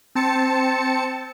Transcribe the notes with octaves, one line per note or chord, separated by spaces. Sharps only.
C4 A5 C#7